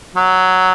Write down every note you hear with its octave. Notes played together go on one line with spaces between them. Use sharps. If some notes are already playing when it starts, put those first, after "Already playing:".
F#3